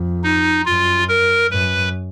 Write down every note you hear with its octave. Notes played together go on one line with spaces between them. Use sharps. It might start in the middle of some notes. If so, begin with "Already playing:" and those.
Already playing: F2
D#4
F#2 F4
A#4
F#2 B4